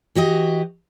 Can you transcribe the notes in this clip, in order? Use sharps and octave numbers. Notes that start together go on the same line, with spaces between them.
E3 F#4 G4 D#5